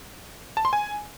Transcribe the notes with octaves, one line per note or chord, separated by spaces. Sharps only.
A5
C6
G#5